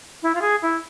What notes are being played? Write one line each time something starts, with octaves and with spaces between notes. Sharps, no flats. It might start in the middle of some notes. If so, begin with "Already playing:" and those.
E4
F4
G#4
E4